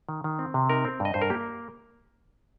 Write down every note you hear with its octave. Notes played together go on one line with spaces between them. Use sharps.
D#3
D#3
C4
C3
D#4 A#4
C4
G2
D#5
G2 C5
A#4
A#3 G4